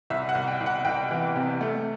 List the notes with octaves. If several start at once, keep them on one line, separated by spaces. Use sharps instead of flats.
C2 E5
F#5
C2
G5
C2
F#5
C2 G5
E3
C3
A3